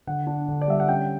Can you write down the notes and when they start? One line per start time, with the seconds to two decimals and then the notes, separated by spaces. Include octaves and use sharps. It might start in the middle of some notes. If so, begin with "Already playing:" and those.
0.07 D3 F#5
0.27 D4
0.48 D3
0.61 D5
0.68 G3 E5
0.80 F#5
0.88 C#4 G5